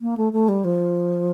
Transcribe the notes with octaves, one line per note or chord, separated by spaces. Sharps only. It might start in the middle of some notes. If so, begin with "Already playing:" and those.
A#3
A3
A3
G3
F3